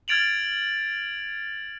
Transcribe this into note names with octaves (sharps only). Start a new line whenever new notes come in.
F6 G#6 A6 D7 F7 F#7